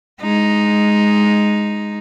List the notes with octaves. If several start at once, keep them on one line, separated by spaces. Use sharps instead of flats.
G#3 D#4